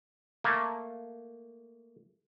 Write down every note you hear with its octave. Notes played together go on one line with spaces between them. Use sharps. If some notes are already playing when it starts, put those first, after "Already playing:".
A3 A#3